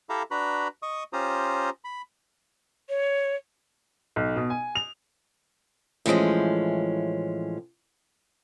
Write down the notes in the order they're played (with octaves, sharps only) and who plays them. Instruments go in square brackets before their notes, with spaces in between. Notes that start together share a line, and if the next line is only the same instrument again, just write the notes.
[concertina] E4 G4 A4 E5 F5 A#5
D4 F#4 B4 A#5 B5
D#5 C#6 D#6
C#4 F4 G4 C5 A#5 D#6
B5
[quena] C#5
[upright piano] B1
B2
G#5
F7
[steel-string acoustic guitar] A2 E3 F3 G#3 C#4